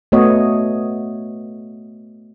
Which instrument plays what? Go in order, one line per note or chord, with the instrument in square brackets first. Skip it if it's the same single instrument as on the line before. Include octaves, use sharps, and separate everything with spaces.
[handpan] A3 B3 F#4 C#5 D#5